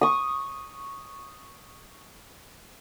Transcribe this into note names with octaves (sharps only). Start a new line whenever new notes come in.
C#6 D#6